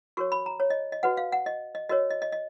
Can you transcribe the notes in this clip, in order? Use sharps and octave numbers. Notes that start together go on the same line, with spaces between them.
F#4 A#4 C#5 C#6
B5
A#5
C#5
D#5
D#5
F#4 B4 F#5
F5
F#5
D#5
D#5
F#4 A#4 C#5 D#5
D#5
D#5
D#5